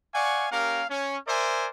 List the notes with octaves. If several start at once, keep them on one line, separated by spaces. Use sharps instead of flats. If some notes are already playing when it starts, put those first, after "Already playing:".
D5 F5 F#5 G#5 C#6
A#3 C#4 G4 A#4 F5
C#4
A#4 C5 D5 E5 G#5